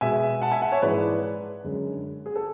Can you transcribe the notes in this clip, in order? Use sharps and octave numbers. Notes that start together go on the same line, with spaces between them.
B2 G#3 E5 G#5
F#5 A5
E5 G#5
F#5 A5
C#5 E5
G#2 E3 G#3 B4 D5
F#2 D3 G#3
G#4
A4